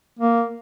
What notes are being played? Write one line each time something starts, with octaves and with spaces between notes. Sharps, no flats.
A#3